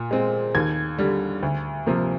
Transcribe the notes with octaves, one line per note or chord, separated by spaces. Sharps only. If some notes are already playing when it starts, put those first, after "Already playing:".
Already playing: A#2
G#3 C4
D#2 G#6
D3 G3
D2
C3 F3 A#3